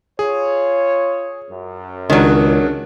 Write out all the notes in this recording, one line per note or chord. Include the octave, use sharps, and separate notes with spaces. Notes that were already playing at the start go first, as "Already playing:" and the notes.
F4 G#4 C#5
F#2
C#2 D#3 F#3 C#4 D4